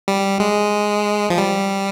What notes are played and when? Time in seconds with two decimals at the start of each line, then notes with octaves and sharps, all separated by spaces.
0.08 G3
0.40 G#3
1.30 F3
1.38 G3